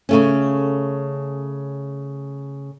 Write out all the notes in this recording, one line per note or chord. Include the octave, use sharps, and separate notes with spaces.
C#3 A3 C#4